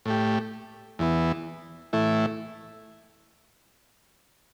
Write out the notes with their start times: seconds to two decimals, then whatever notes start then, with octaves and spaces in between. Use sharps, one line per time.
0.06 A2 A3 G4
0.99 E2 E3 B3
1.93 A2 E3 A3 E4